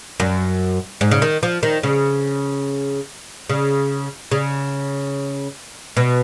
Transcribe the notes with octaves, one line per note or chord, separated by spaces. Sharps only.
F#2
G#2
C#3
D#3
F3
D#3
C#3
C#3
C#3
B2